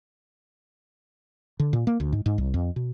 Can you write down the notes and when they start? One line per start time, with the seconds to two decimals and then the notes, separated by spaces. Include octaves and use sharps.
1.60 D3
1.73 A#2
1.87 A#3
2.00 D2
2.13 G#2
2.26 G#2
2.38 C2
2.54 F2
2.76 B2